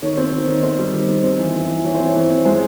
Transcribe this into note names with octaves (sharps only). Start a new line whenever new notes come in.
D#3 C#5
C4
D#3
D#3
C4 C5
G3
D#3
D#3
C4
E3
C4
E3
E3 C#5
C4 C5
C#5
E3
C4
G#3 C5